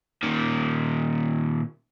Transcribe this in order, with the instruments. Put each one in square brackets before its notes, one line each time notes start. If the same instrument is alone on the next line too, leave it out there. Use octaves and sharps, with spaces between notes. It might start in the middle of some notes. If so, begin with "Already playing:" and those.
[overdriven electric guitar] A#2 D#3